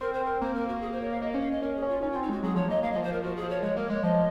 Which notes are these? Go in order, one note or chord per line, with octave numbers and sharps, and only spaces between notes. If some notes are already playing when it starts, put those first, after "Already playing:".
C4 A#4
C5
C4 A#4
A#3 C5
A#4
F#4
G#4
C5
C#5
F5
A#3 D#5
C#4 C5
F5
D#5
C#4 A#4
G#4
C#4
F4
C#4 D#4
F4
C4
D#4
G#3 F#4
F#3 G#4
F3 C#5
A#3 D#5
A#3 F5
F3 D#5
C5
F3 A#4
F3 F#4
G#4
F3
C#5
G#3 C#5
A#3 A#4
G#3 C#5
F3 D#5